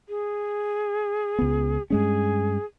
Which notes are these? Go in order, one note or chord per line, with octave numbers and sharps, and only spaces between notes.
G#4
C#2 B3
G2 G#3 C#4 G#4